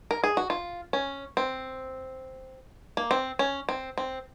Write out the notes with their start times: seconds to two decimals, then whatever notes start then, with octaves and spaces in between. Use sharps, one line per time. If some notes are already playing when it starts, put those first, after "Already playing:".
0.11 A#4
0.24 G#4
0.37 F#4
0.50 F4
0.93 C#4
1.37 C4
2.97 A#3
3.11 C4
3.39 C#4
3.69 C4
3.98 C4